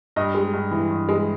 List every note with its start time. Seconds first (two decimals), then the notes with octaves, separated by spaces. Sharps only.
0.16 G2 D#5
0.35 G#3
0.53 G2
0.71 E3
0.90 G2
1.09 G#3